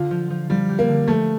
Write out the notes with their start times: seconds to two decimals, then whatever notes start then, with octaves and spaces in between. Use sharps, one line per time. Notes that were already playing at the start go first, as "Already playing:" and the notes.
Already playing: D3 F4
0.11 F3
0.30 F3
0.50 F3 G3
0.69 G4
0.79 A#3
0.88 D3
1.08 F3 A3